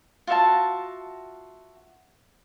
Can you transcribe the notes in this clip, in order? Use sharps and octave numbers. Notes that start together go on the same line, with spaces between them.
F4 F#4 E5 A5